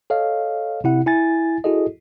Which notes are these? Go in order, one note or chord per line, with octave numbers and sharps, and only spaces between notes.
A4 C#5 D#5 F5
C3 E4 F#5
E4 G#5 A6
E4 F#4 G#4 A4 D#5